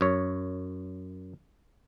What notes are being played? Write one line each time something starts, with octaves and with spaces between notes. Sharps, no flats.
F#2 C#5